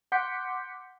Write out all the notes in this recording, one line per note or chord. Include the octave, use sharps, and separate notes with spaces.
F#5 C6 D6 G6 B6 C#7